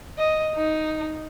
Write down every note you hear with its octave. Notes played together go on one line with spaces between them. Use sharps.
D#5
D#4